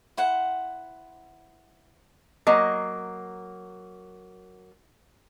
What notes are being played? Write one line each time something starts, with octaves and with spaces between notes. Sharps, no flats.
E4 C5 F#5
F#3 A#3 D#5